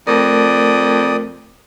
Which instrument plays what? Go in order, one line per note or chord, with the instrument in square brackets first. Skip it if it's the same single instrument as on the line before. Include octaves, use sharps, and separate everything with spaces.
[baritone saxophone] F2 [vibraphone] A3 A#4 [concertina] D5 D#6